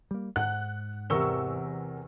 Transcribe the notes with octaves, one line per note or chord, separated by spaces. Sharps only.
G3 A#3
G#2 F#5 F#6
E2 C3 A#4 C#6 E6 G7